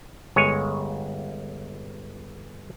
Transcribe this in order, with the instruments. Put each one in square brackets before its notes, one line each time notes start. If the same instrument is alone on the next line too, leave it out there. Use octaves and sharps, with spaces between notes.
[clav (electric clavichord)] G1 G#3 C#5 G#5